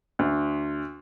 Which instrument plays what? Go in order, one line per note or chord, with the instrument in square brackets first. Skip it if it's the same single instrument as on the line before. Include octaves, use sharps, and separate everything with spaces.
[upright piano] D2